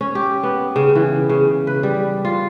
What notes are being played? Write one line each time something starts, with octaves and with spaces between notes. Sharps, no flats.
C#4
G4
B3
C#3
E3
C#3
B4
G3
F4